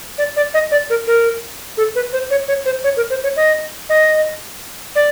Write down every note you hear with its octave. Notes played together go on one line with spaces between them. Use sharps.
D5
D5
D#5
D5
A#4
A#4
A4
B4
C5
C#5
C#5
C5
C#5
A#4
C5
C#5
D#5
D#5
D5